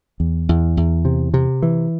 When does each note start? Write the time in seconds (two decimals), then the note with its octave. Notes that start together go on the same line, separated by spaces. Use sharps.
0.20 E2
0.49 E2
0.77 E2
1.05 C3
1.34 C3
1.62 E3